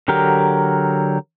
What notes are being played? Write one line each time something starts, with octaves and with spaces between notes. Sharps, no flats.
D3 F#3 G4 A#4